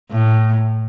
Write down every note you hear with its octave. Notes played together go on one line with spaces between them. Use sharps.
A2